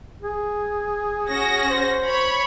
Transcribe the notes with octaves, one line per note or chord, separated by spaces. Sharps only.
G#4
C#4 F#4 A#6
C5
C#5 B5